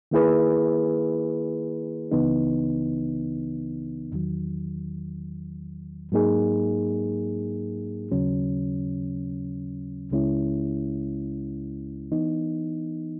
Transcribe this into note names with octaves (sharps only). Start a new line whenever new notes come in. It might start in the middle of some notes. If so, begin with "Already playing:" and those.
D#3 A#3 E4 G#4 B4
C#2 C#3 E3 B3 D#4
E2 D#3 F#3
G#2 F#3 A#3 D#4 G#4
D#2 C#3 F#3 C#4
C#2 C#3 G#3 C#4 E4
E3 B3 D#4